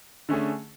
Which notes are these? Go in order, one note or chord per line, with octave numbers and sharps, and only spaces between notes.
D3 A3 C#4 G#4